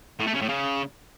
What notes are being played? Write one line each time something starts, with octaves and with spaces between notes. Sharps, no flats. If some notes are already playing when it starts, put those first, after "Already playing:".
A2
A3
C#3
A2
C#3